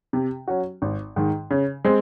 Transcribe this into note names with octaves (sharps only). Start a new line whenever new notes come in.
C3
F#3 C#4 F#4
G#1
G#2 D#3
C#3
G#3 C4